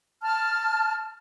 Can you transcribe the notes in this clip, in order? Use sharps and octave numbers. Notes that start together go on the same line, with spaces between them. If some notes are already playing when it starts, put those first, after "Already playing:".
A5 F6